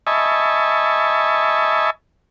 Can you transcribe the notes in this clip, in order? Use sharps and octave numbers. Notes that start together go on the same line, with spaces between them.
D#5 E5 G#5 A5 B5 C#6